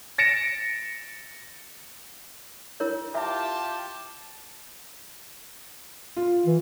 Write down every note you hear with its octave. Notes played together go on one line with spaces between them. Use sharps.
A6 A#6 C#7 D7 E7
E4 A#4 C#5
F4 G4 E5 A5
F4
E3